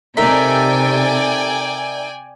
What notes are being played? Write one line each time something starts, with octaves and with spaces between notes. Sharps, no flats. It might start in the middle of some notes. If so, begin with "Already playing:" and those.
C3 D#4 A4 A#4 D5 E5 G5 G#5